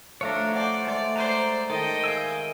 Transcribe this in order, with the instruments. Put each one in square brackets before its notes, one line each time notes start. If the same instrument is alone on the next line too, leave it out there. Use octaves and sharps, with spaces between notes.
[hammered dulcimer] F3 A3 [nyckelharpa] D4 [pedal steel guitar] C#5 F5 A#5
[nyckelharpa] C5 D5 [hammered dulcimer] F#5 A5
[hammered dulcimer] G#3 A3 [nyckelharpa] D5
[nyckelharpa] C5 D5 [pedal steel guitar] A#5
[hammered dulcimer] D#3 [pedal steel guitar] A4 [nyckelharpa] D#5 G5
[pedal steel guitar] F5 G#5 E6